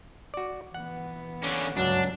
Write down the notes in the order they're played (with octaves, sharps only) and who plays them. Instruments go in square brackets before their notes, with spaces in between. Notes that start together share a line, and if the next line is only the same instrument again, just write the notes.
[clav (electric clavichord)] F#4 D5
[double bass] E3 B3 [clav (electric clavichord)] F#5
[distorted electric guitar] D3 C#4
[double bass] G1 [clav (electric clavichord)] C#2 F#2 [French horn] F#3 [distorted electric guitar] D4